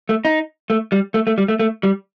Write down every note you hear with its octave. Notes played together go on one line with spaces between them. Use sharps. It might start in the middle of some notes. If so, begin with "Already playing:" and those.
A3
D#4
A3
G3
A3
A3
G3
A3
A3
G3